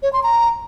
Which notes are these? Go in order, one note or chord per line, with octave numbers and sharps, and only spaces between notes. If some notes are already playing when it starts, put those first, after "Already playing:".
C#5
C6
A#5